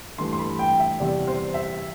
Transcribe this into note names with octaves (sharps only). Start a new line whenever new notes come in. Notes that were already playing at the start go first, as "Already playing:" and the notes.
G2 E3 A3 C6
C6
B5
G5
E5
E2 C3 G3 D5
C5
E5